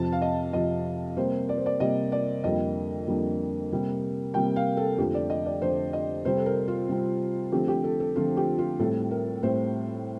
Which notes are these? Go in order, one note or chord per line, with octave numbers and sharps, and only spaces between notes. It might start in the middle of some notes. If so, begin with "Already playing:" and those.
Already playing: F2 C3 F3 A5
F5
D#5
F2 C3 F3 D#5
C3 G3 A#3 C5
D5
C5
D5
C3 G3 A#3 D#5
D5
F2 D3 G3 A#3 D#5
F2 D3 G3 A#3
C3 G3 A#3
C3 G3 A#3 G5
F5
A4
F2 D3 F3 A3 G4
D5
D#5
D5
F2 D3 F3 A3 C5
D#5
C3 G3 C4 C5
A4
A#4
F4
C3 G3 C4
D3 F3 A3 C4 G4
G4
A4
A4
D3 F3 A3 C4 F4
G4
F4
A2 G3 C4 A4
A#4
A2 G3 C4 C5